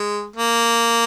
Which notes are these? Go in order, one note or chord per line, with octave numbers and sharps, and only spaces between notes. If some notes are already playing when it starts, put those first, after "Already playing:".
Already playing: G#3
A#3